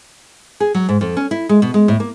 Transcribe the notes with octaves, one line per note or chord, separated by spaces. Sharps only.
G#4
F#3
G#2
F2
C#4
E4
G#3
B2
G#3
A2
A#3